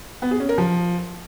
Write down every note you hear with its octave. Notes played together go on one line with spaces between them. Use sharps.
B3
G#4
C#4
A#4
F3